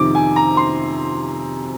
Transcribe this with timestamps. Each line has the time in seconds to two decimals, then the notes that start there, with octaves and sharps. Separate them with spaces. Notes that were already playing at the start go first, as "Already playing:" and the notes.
Already playing: F2 C3 D#3 D6
0.15 G#5
0.36 A#5
0.57 C6